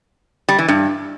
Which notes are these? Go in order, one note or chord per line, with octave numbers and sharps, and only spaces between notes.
G3
E3
G2